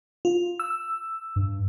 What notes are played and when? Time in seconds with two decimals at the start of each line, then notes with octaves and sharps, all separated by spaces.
0.25 F4
0.60 E6
1.36 G2